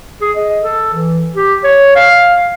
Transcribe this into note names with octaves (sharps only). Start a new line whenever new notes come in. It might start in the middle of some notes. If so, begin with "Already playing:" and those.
G#4
D#5
A4
E3
G4
C#5
F5